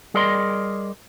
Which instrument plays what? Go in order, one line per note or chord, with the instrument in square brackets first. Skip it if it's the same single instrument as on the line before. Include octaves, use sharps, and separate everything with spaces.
[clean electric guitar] G3 G#4 A#4 D5 D#5 C6